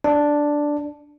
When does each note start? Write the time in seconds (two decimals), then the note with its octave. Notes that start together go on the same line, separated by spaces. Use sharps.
0.04 D4